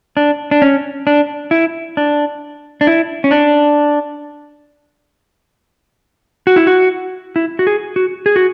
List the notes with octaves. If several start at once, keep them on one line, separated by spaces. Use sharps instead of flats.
D4
D4
C#4
D4
E4
D4
D4
E4
C#4
D4
F#4
E4
F#4
E4
F#4
G#4
F#4
G#4
F#4